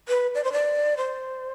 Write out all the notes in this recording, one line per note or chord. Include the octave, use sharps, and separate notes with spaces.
B4
D5
C5
D5
C5